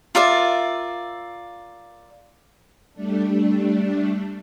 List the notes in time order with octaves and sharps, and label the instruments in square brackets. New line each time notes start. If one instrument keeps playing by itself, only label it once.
[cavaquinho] F4 A#4 D5 E5
[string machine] G3 A3 D4